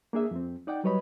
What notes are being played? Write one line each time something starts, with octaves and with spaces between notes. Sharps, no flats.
A#3 D4 G#4 E5
F2 C4
D#4 D5 F#5 G5
F#3 G3 B4 C#5 D#5 B5